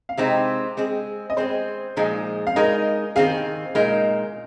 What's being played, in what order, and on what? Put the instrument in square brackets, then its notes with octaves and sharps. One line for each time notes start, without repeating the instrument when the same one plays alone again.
[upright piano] F5
[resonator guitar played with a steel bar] C3 G#3 C4 D#4 [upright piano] D#5
[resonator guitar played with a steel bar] G#3 C4 G#4
[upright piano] D#5
[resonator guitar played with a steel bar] G#3 C4 G#4 [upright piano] C5
[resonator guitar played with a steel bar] A#2 F3 G#3 D#4 G#4
[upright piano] F5
[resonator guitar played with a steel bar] G#3 D#4 A#4 [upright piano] D#5
[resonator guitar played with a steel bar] D#3 C4 G#4 [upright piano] F5
[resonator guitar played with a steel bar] A#2 G#3 D#4 A#4